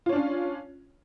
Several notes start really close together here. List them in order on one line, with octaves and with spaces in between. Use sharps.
F4 C#5 D4 C#4